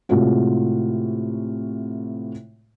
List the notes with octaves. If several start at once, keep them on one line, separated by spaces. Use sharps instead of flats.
A2 C3 G#3 F4 F#4